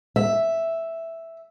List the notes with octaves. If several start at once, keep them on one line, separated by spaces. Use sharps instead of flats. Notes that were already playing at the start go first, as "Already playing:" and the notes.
E5